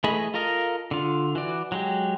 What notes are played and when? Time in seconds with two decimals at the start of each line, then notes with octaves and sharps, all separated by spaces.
0.04 E3 A3 G#4 D#5 B5
0.34 F4 A4 A#4 D#5 F5
0.91 D3 F4
1.35 E3 F#4 D5
1.72 F#3 G#3 G4